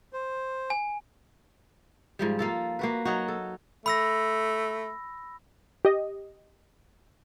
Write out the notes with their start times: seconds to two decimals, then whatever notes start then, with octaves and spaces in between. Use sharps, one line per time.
0.13 C5
0.70 G#5
2.19 G#2 F3 G3
2.39 A#3 F4 A4
2.79 A#3 F#4 B4
3.05 F#3 D#4 F#4
3.28 A4
3.86 A3 B5 E6 A#6
5.85 G4 D#5